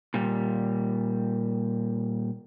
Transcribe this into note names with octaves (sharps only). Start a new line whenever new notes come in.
A#2 G3